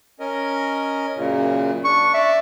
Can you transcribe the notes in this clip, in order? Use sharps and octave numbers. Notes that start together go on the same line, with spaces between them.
C#4 A#4 D#5
F#2 A#2 C#3
D4 C#6
D5 E5